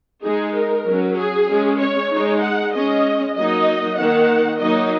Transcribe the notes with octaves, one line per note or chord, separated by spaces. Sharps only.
G#3 D#4 G#4
A#4
F#3 C#4
G#4
G#3 C#4
C#5
G#3 D#4
F#5
G#3 C#4 D#5
F#3 A#3 D#4 D#5
D#3 A#3 D#4 F#5
F#3 A#3 D#4 D#5